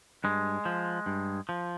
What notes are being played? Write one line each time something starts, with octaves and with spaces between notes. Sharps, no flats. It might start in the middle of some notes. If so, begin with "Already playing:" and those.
G2 G#3
F3
G2
F3